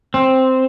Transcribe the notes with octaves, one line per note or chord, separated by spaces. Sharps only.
C4